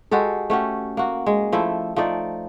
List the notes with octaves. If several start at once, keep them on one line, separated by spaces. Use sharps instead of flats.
G#3 F#4 G4 A4
A3 C#4 F#4 G4
A#3 F#4
G#3
F3 A3 E4
F3 A3 D#4 D5